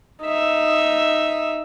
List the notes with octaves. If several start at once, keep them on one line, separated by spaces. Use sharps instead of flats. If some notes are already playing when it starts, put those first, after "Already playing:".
D#4 E5